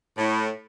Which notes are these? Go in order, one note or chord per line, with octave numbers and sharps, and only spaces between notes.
A2